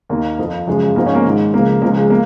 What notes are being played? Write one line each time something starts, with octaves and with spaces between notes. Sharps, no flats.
D#2 D#3 A#3
F2 F3
F#2 C#3 F3 G#3
G#2 F3 A#3
C#4
A#3
G#2 D#3
C#2 C#3 F3 A#3
C#2 C#3 F3 A#3
G#3
A#3